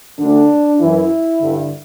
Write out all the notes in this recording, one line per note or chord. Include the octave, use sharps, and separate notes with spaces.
D2 D3 D4
F#2 E3 E4
G2 D3